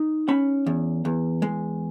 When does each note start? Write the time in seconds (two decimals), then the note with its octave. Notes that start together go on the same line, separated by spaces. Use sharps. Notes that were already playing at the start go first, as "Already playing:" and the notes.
Already playing: D#4
0.28 C#4 B5
0.67 E2
1.05 E2
1.42 G#3